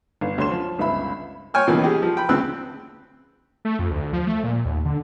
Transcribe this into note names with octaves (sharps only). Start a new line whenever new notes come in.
G1
D2 C#5 C6 E7
F3
G1 C#2 C#3 E5 B5
C#5 G5 G#5 F6
C#2 B2 D#3 E3 A#3
G4 G#4
F3
G5 B5
D2 C#3 C4 E6 F#6
A3
F2
D2
F3
A3
A#2
D#2
D3